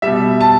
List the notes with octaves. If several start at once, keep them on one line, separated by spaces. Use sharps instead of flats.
B2 G3 E5
A5